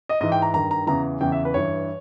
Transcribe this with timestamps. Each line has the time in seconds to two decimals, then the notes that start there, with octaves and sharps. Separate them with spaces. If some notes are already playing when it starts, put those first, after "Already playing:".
0.09 D#5
0.21 G#2 E3 D#5
0.32 G5
0.42 A#5
0.53 G2 D#3 A#5
0.71 A#5
0.87 E2 C#3 E3 A#5
1.21 E2 C#3 E3 G5
1.32 E5
1.45 B4
1.54 G2 E3 C#5